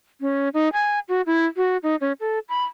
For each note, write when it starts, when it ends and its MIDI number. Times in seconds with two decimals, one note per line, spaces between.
0.21 0.49 61
0.54 0.69 63
0.73 0.99 80
1.09 1.22 66
1.26 1.46 64
1.57 1.77 66
1.83 1.96 63
2.01 2.13 61
2.20 2.39 69
2.49 2.64 83